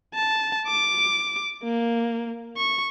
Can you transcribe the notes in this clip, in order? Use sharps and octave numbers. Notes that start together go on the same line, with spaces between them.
A5
D6
A#3
C#6